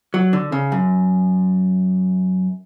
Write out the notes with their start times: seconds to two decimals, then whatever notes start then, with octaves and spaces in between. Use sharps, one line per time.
0.14 F#3
0.33 D3
0.52 C#3
0.72 F#2